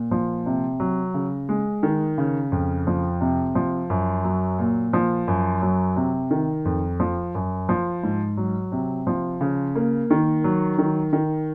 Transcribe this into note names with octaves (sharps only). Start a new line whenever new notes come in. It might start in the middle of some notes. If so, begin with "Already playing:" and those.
Already playing: A#2
F3
C3
F#3
C#3
G#3
D#3
C#3
F2
F3
C3
F3
F#2
F#3
A#2
F3
F#2
F#3
C3
D#3
F2
F3
F#2
F3
G#2
F#3
C3
F3
C#3
A#3
D#3
F#3
D#3
D#3